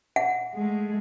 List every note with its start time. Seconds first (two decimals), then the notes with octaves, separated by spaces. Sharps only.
0.16 F#5
0.54 G#3 A3